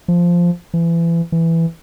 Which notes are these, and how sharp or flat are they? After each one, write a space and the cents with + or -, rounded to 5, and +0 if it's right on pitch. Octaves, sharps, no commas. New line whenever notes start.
F3 -5
E3 +30
E3 +5